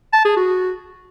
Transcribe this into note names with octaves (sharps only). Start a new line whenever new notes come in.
A5
G#4
F#4